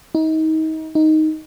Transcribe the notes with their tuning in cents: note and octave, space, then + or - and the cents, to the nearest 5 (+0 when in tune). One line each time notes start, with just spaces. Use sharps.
D#4 +30
D#4 +5